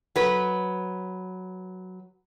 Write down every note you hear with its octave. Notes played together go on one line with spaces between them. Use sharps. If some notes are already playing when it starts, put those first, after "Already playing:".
F#3 B4